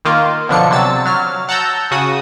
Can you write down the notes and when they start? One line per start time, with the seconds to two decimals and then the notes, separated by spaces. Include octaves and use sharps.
0.05 D#3 A#3 F4
0.49 B2 D3 F3 D4 C#7
0.71 C3 F#3 E6 A6
1.05 F#3 F6
1.49 F#5 A5 A#5 E6 G6
1.91 C#3 F#4 D#6